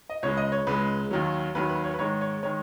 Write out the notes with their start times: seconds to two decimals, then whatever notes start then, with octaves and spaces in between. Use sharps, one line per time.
0.10 D#5
0.23 C#2 C#3 G#3 C#5
0.37 D#5
0.52 C#5
0.67 C#2 C#3 G#3 B4
1.11 D#2 D#3 F#3
1.55 D#2 D#3 F#3 B4
1.69 B4
1.84 C#5
1.94 B4
1.99 G#2 D#3 G#3 C#5
2.21 C#5
2.43 D#3 G#3 C#5